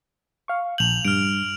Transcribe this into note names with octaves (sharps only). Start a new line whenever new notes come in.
F5 C#6
A#1 G6 F7 F#7
G2 F6 D7